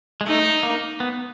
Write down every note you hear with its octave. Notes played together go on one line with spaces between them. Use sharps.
G#3
A3 D#4
A#3
B3